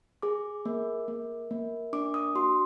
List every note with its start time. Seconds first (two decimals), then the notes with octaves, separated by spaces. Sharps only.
0.22 G#4 D6
0.65 A#3
1.08 A#3
1.51 A#3
1.93 D4 D6
2.14 D#6
2.35 F#4 C6